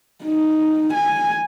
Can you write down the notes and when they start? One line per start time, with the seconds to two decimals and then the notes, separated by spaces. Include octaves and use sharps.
0.24 D#4
0.94 G#5